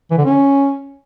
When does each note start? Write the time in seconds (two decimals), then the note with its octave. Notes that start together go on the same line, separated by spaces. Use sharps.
0.11 E3
0.18 D3
0.25 C#4